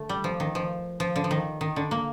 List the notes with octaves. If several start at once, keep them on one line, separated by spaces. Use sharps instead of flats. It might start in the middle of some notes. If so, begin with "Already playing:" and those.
Already playing: D3 A3
G3
F3
D#3
F3
F3
D3
F3
D#3
D#3
D3
A#3